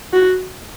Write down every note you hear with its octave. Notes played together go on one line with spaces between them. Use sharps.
F#4